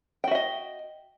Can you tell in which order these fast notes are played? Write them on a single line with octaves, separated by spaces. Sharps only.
G5 F#4 E5 D#5